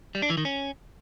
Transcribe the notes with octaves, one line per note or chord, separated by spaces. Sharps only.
G3
D4
E3
D#3
C#4